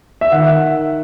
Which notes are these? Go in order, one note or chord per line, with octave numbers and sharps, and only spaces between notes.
E5
D#3 F#5